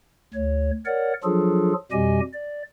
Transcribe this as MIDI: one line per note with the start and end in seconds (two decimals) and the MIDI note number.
0.34 0.71 38
0.34 0.71 73
0.86 1.13 70
0.86 1.13 73
0.86 1.13 74
0.86 1.13 78
1.24 1.73 53
1.24 1.73 54
1.24 1.73 62
1.24 1.73 65
1.24 1.73 68
1.24 1.73 69
1.92 2.20 41
1.92 2.20 47
1.92 2.20 55
1.92 2.20 67
1.92 2.20 75
1.92 2.20 80
2.33 2.63 74